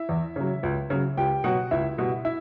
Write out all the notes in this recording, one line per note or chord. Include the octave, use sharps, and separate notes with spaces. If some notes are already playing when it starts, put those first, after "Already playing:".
Already playing: E4 E5
E2
C#3 F#3
C#2
C#3 F#3
C#2 G4 G5
B2 F#3 F#4 F#5
C#2 E4 E5
B2 G3
E4 E5